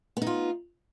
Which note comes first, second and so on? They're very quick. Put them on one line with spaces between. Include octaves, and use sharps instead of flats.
B3 D#4 F4